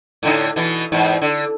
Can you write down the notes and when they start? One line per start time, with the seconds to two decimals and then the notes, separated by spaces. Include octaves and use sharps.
0.23 A2 D3 D#4
0.56 B2 E3
0.92 E2 G#2
1.22 D3